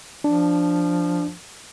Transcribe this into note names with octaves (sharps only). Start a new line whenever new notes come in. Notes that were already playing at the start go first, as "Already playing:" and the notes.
F3 D4